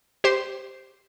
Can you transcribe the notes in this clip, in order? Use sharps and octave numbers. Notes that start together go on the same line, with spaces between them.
G4 C5 C6